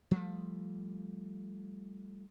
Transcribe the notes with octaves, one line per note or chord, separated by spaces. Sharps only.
F3 G3 A3